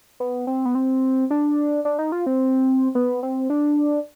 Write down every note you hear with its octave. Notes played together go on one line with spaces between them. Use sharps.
B3
C4
B3
C4
D4
D4
D#4
F4
C4
B3
C4
D4